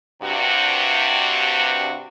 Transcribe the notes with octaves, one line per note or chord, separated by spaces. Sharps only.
G2 C3 F#4